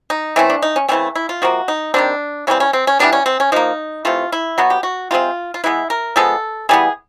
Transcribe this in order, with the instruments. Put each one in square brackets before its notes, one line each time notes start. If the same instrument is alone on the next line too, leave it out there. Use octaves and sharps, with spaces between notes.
[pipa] D#4
E3 A3 C4 C#4
D4
D#4
C#4
C#3 E3 A3 C4 C#4
E4
F4
C3 F3 A#3 F#4
D#4
D#3 G3 C4 D4
C#3 E3 G3 C4 C#4
C#4
C4
C#4
E3 G3 B3 D4
C#4
C4
C#4
F3 A#3 D#4
C3 E3 A3 F4
E4
B2 F#3 B3 F#4
G4
F#4
C3 E3 G#3 C4 F4
F4
E3 G#3 B3 E4
A#4
F3 G#3 B3 A4
E3 G3 B3 G#4